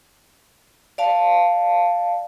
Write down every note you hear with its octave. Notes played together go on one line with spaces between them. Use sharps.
D5 F5 A5